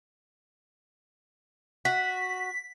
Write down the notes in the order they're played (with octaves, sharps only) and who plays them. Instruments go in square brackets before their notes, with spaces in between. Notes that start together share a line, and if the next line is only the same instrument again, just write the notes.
[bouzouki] F#4 [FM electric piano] B6